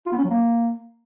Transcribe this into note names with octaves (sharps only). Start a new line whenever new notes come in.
F4
B3
C#4
F#3
A#3